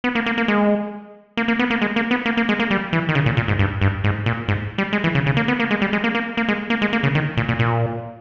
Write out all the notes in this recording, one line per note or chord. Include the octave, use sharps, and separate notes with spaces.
B3
A#3
A#3
A#3
G#3
A#3
A#3
B3
A#3
G#3
A#3
B3
A#3
A#3
G#3
A#3
G3
E3
D#3
C#3
A#2
A#2
G#2
G2
G2
G#2
A#2
G#2
G3
G#3
E3
C#3
C#3
A#3
B3
A#3
G#3
G3
G#3
A#3
A#3
A#3
G#3
A#3
G#3
A#3
C#3
D#3
A#2
A#2
A#2